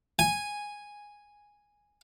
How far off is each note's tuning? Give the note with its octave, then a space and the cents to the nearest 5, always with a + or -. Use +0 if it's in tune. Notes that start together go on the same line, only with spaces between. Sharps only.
G#5 -5